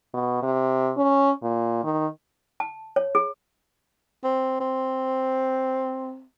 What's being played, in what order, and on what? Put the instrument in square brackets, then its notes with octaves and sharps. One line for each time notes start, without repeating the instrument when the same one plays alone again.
[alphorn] B2
C3
C#4
A#2
D#3
[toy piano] A5
C#5
G#4
[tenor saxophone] C4
C4